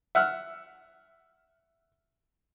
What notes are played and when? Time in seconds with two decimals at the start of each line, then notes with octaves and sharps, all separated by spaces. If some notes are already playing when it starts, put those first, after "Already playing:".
0.15 E5 F#5 E6 F6